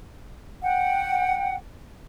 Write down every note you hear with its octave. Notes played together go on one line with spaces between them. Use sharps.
F#5 G5